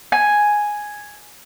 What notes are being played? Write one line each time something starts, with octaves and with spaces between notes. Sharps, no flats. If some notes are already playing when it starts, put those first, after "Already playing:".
G#5